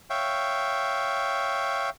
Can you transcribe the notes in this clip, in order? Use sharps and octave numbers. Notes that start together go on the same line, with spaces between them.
C#5 E5 F5 G5